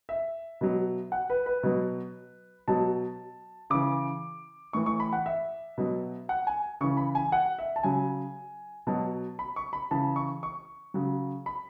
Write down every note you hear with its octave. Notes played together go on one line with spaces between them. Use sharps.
E5
B2 F#3
F#5
B4
B4
B2 F#3
B2 F#3 A5
C#3 E3 D6
A2 E3 C#6
C#6
B5
F#5
E5
B2 F#3
F#5
G#5
C#3 E3 C#6
B5
G#5
F#5
E5
A5
C#3 F#3 G#5
B2 F#3 A5
B5
C#6
B5
C#3 E3 A5
C#6
C#6
C#3 F#3
B5